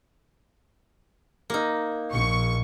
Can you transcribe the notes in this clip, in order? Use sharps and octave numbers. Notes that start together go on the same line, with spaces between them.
A#3 D#4
A#1 C#6